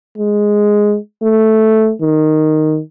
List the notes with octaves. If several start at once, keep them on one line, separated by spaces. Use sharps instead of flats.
G#3
A3
D#3